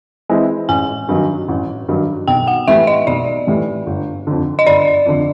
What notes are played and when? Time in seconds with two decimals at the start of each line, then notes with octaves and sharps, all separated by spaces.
0.29 E3 G#3 C4 E4
0.69 A1 G#5
1.09 G2 D#3 F#3
1.48 A1
1.88 G2 D#3 F#3
2.28 B1 G5
2.47 F#5
2.68 A2 E3 G3 E5
2.87 D#5
3.07 B1 D5
3.47 A2 E3 G3
3.86 G1
4.27 F2 D3
4.59 D#5
4.67 G1 D5
5.06 F2 D3